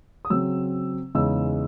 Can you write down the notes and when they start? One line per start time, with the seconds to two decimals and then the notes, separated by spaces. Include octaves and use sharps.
0.25 D#6
0.30 C#3 F#3 C4 E6
1.15 E2 C#3 G#3 D#4 E6